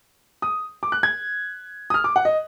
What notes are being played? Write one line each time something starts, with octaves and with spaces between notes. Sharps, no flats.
D#6
D6
F#6
G#6
D#6
F6
D6
F#5
D#5